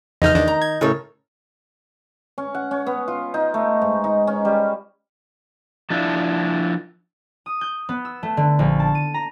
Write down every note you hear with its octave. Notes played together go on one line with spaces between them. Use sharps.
F1 E2 D#4 D#5 F6 G6
E2 D#3 D4
A#5
G#6
A2 C#3 C#4 A4 A#4 C#5
C#4
F#5
C#4
B3
F4
D#4
A3
G#2
D#4
C#4
G3
F3 D4 E4
D#6
G6
B3
E6
A3
D3
A#1
A5
D#7
A#5